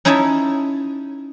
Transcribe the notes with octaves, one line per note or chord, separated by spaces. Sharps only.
C#4 D#4 E4 C#5 E5 A5